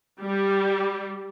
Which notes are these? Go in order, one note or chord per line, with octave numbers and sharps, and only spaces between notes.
G3